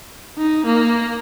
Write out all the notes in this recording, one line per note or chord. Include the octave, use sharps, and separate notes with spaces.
D#4
A#3